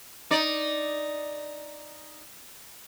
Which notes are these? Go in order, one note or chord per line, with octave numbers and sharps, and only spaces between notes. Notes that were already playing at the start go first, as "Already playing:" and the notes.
D#4 D5